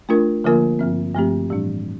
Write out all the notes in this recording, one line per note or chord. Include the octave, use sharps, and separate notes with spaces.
A3 D4 F4 A#4
D3 F3 A#3 F4 A#4
G2 F3 C4
G2 F3 A3 C4 G4
A2 E3 G3 D4